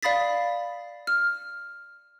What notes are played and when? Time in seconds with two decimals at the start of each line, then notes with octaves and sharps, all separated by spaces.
0.03 D5 F5 B5 D#6 A6 B6
1.07 F6